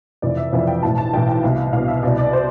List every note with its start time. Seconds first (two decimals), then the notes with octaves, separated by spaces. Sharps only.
0.22 F1 F2 E3 D5
0.37 E5
0.52 F1 F2 E3 F5
0.67 G5
0.83 B1 A2 E3 A5
0.98 A5
1.13 B1 A2 E3 G5
1.28 G5
1.43 C2 B2 F5
1.73 C2 B2 F5
1.88 E5
2.03 C2 B2 D5
2.18 D5
2.33 C5